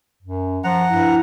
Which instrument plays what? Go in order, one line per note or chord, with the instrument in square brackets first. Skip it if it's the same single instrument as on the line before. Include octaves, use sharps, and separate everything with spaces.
[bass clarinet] F#2
[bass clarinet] F3 [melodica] F#5 A#5
[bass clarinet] G2 [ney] E4